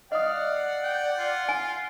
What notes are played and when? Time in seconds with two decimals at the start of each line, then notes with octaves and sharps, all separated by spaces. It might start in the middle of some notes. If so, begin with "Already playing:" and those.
0.12 D5 D#5 F5 F#5 D#6
0.83 G5
1.19 F4
1.49 G#5